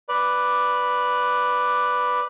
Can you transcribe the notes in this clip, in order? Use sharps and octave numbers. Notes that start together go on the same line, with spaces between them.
B4 D5